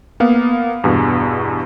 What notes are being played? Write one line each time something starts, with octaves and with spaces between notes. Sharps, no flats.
A#3 B3 F5
E2 G2 B2